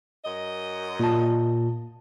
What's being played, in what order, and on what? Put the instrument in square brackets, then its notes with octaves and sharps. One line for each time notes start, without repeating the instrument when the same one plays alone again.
[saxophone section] F#2 D#5
[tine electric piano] A#2 A5